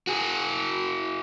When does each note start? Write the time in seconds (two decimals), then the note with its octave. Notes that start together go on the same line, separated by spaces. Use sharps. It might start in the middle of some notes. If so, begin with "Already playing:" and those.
0.07 F#4 G#4